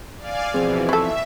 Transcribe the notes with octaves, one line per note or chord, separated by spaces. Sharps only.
D5 F5 G#5
B2 E3 F3 C4 G#4 C5
E4 A4 E5 C#6